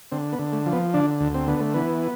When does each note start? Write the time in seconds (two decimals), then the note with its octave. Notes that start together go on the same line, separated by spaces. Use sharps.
0.12 D3 C4
0.32 B3
0.39 D3
0.53 A3
0.66 F3
0.73 B3
0.94 D3 D4
1.21 D2
1.34 C4
1.48 D3 B3
1.60 A3
1.74 E3 B3